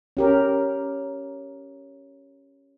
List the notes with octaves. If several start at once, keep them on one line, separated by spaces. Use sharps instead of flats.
C#4 G4 A#4